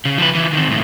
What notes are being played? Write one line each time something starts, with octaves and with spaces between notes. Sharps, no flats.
C#3
F3 B4
E3 F3
D#3 C4
C#2 A2